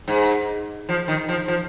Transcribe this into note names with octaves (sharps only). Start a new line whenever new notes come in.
G#2
F3
D#3
F3
F3